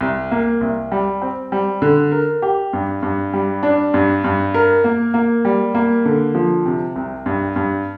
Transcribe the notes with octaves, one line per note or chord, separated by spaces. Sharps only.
C2
A#3
C2
G3
C4
G3
D3
A#4
G4
G2
G2
G3
D4
G2
G2
A#4
A#3
A#3
G3
A#3
D3
F3
C3
C2
G2
G2